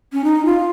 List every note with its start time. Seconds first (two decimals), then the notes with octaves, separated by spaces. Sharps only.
0.13 C#4
0.24 D#4
0.45 F4